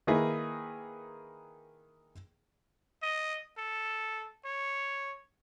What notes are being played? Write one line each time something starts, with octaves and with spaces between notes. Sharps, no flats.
D#3 A#3 D#4 E4 G#4 B4
D#5
A4
C#5